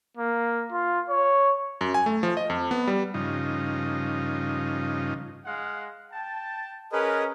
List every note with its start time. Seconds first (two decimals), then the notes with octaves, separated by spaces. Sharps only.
0.17 A#3
0.72 F4
1.09 C#5
1.81 F#2
1.94 G#5
2.06 A3
2.23 F3
2.37 D#5
2.50 F2
2.71 B3
2.87 G3
3.14 G2 C#3 F3 D#4
5.45 G#3 F5 F#5
6.12 G5 A5
6.92 C#4 G#4 A#4 B4 D#5